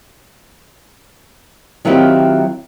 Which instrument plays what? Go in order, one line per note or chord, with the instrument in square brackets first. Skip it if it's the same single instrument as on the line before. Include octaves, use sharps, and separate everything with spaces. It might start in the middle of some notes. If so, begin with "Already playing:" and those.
[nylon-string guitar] D#3 F#3 C4 E4 F4 G4